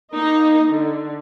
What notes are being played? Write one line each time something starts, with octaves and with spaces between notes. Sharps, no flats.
A#3 D#4 D#5
D3